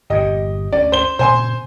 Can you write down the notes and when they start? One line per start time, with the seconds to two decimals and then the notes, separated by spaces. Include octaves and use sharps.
0.10 G1 G2 A#2 G4 D#5
0.73 D2 C#4 D5
0.92 C5 G7
1.19 A#2 C#3 C5 G#5 C6